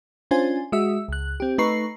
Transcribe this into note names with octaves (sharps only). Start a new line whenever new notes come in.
C#4 D4 F4 C5 G#5
G#3 F#4 E5 E6
C#2 F#6
C4 G4
A3 D#4 B4 A#5 C#6 C7